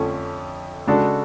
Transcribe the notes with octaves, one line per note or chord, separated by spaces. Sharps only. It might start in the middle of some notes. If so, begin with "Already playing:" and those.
Already playing: F2 D3 F3 A3 C#4
C#3 G#3 D4 F#4 A4